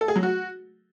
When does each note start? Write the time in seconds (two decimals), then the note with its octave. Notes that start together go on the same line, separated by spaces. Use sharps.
0.01 A4
0.08 G#4
0.16 F#3
0.23 F#4